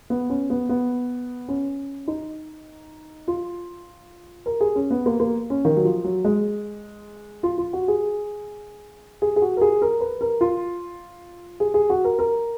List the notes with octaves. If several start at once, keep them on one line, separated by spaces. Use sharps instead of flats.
B3
C#4
B3
B3
C#4
D#4
F4
A#4
G#4
C#4
B3
A#3
A#3
C#4
D#3
F#3
F3
F#3
G#3
F4
F4
F#4
G#4
G#4
G#4
F#4
A#4
G#4
A#4
B4
A#4
F4
G#4
G#4
F#4
A#4
A#4